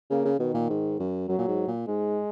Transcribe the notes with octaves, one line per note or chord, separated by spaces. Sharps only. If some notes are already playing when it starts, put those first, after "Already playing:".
C#3 A#3
C#3
B2 D#3
A#2
G#2
F#2
F#2 F#3
A#2
G#2
A#2
G#2 G#3